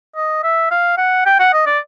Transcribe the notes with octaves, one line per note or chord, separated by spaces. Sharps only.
D#5
E5
F5
F#5
G5
F#5
D#5
D5